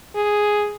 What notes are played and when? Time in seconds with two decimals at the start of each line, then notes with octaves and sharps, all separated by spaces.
0.15 G#4